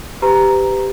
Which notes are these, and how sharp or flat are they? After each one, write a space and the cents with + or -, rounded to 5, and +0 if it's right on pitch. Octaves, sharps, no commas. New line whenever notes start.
G4 +0 B4 +35 A#5 +0